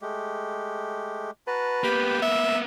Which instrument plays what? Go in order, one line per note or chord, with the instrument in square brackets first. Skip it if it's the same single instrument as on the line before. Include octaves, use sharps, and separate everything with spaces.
[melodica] G#3 A3 G4
[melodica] F#4 A5 A#5 [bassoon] B4
[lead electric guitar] A#3 B3 [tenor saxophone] G4 [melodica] G5 B5
[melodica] E4 [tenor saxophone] E5